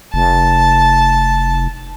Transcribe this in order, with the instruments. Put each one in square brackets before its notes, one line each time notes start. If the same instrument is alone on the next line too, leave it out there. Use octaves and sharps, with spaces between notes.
[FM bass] F1 [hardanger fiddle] A5